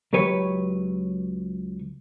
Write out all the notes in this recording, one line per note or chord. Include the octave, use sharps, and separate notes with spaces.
C#2 F#3 G4 B4 C#5